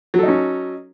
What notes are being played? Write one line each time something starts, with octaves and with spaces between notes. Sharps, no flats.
F#3 C#4 D#4 A4